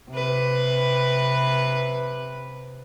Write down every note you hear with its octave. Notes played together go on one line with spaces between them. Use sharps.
C3 B4